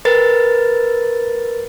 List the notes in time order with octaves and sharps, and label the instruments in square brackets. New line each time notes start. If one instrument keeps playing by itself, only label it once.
[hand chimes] A#4 B4 A6